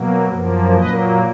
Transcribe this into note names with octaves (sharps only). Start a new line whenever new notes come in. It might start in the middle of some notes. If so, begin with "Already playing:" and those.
Already playing: B2 F#3 A#3
F#2 F3 A#3
A#2 F#3 A#3 B4 D#5